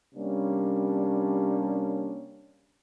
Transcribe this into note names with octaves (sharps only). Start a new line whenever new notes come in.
C3 G3 A#3 C#4 D4